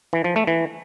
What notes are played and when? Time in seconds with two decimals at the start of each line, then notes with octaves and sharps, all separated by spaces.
0.13 E3
0.24 F3
0.36 A3
0.47 E3